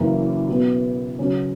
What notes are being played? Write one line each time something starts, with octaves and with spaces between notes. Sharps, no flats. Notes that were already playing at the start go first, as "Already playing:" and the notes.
Already playing: F#1 F#2 E3 A#3 C#4
B2 F#3 B3
C#3 F#3 C#4